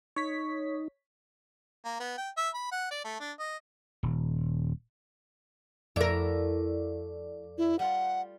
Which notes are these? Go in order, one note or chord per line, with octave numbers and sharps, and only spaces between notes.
D#4 C#5 B6
A#3
B3
G5
E5
B5
F#5
D5
A3
D4
D#5
D#1
F2 A3 E4 F#4 A4 A#4 D5
E4
G3 F4 F#5